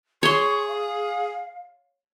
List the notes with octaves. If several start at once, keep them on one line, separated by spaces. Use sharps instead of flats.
G#4 C#5 C6 C#6
F5